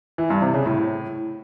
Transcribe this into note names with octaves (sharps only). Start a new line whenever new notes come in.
E3
G2
C3
C#3
A2